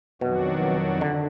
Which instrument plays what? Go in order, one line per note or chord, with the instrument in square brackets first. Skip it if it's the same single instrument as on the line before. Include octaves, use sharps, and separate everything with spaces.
[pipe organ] F2 D#3 F#3 D4 F#4 [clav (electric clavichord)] B2
[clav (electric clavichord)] D3